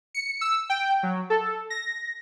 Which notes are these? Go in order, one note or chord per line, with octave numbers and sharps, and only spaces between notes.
C#7
E6
G5
F#3
A4
A#6